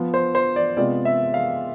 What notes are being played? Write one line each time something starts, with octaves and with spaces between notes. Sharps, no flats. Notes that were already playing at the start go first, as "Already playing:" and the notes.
Already playing: F3 B3 F4
C5
C5
D5
C3 G#3 B3 F4 D5
E5
F5